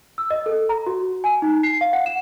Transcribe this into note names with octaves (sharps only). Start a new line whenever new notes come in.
E6
D#5
A4
A#5
F#4
G#5
D#4
C7
F5
F#5
E7